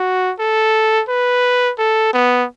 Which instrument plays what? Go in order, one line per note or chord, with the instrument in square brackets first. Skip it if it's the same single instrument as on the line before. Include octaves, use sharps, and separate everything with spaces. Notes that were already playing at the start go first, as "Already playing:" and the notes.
Already playing: [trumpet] F#4
A4
B4
A4
B3